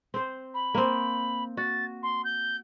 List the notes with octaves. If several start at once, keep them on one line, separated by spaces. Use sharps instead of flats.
C4 C5
B5
A#3 C4
F#4 A6
C6
G6